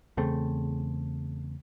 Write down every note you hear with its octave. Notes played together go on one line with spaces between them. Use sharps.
E2 C#3 A3 C4